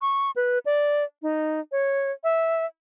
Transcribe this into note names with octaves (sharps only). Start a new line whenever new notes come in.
C#6
B4
D5
D#4
C#5
E5